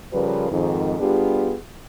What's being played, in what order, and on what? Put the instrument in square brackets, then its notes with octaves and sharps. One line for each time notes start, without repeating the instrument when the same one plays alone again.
[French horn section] C#3 F3 G3 A#4 B4
F2 G#2 D#3
G3 B3 D4 F4 G4 G#4